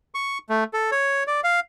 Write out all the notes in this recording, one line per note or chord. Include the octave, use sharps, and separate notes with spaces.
C#6
A3
A4
C#5
D5
F5